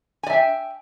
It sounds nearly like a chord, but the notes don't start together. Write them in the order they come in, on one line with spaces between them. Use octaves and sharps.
G#5 D5 E5 G5